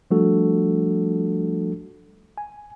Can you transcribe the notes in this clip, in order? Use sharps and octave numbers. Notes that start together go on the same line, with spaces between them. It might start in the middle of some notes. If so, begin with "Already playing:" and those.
F3 G3 A3 D4 F#4 A4
G#5